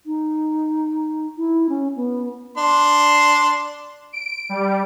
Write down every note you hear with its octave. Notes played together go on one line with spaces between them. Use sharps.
D#4
E4
C#4
B3
D4 C6
D7
G3